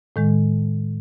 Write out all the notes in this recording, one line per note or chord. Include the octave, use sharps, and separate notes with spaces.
A2 D#3 G#3